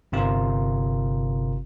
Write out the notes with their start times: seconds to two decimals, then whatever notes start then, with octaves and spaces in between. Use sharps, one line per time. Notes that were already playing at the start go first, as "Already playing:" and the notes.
0.12 G1 C3 F4 A#4